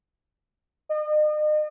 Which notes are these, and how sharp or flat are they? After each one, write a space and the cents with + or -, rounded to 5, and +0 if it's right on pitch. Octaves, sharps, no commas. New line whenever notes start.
D#5 -40